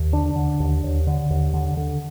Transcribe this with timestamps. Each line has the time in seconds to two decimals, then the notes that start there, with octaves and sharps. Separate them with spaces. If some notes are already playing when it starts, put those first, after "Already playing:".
Already playing: D#2
0.13 D3 D4
0.36 D3
0.60 D#2
0.84 D#2
1.07 D3
1.30 D#2
1.54 D3
1.77 D3